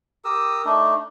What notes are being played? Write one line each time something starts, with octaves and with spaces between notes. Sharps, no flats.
G4 A#4 D#6 E6
A3 D4 D#4